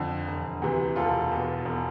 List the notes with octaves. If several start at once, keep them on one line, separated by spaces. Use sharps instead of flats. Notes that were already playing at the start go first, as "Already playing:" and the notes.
Already playing: F2 D3
E1
D2 C3 E3
E1 F4 A4
E2 B2
E1